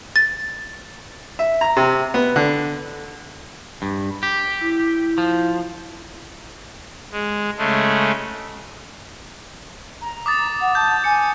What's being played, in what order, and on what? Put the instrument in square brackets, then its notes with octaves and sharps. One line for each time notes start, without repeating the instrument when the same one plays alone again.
[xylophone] A6
[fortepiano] E5
A#5
C3
B3
D3
[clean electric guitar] G2
G4
[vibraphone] E4
[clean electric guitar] F3
[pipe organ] G#3
C#3 G#3 A3
[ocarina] A#5
[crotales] D6 D#6 A6
[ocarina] F#5
[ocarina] A5 [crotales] G6
[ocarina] G#5 [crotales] C#7